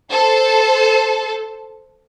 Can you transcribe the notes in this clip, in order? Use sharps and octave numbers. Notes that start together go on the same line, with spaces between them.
A4 C5